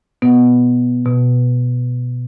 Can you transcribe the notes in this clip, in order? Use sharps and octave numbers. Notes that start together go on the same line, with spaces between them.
B2 B3
B2